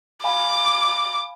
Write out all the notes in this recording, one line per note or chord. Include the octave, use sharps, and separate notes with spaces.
F5 G#5 B5 D6